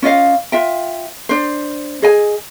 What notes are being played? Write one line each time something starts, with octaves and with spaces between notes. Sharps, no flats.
C#4 F4 D#5 F5
F4 E5 G5
D4 C5
G#4 D#5 G#5